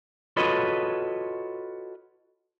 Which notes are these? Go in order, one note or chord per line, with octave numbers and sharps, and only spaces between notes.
F4 F#4 A4 B4 C#5 D#5